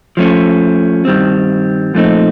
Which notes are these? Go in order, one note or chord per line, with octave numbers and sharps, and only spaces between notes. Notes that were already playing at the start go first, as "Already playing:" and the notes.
F3 A3 C#4
G2 D#3 G3 C4
A#2 F3 A3 C4 D#4